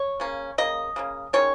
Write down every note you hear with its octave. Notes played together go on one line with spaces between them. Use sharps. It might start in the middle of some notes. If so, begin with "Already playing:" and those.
Already playing: C#5
C#3 A#3 C#4
C#3 A#3 D#5
C#3 A#3 C#4
D#3 G#3 C#4 C#5